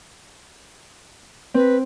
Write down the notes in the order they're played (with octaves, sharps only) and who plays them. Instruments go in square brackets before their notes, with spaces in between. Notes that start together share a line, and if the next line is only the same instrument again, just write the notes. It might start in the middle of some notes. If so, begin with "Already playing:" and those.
[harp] C4 [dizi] B4